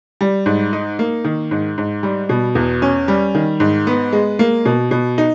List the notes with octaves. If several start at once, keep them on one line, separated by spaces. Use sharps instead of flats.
G3
G#2
D#4
A#3
D#3
G#2
G#2
G3
B2
E2
C#4
G3
D#3
G#2
B3
G#3
A#3
B2
B2
D#4